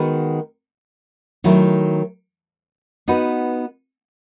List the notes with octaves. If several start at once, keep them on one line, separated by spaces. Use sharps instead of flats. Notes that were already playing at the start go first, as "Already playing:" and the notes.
Already playing: D#3 G#3 B3 F#4 B4
D#3 F#3 A3 E4
B3 D#4 F#4 B4